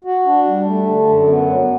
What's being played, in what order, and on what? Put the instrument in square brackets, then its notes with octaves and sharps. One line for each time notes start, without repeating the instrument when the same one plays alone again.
[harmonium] F#4
D4
G3
A3
D3
F#2
B3
F#3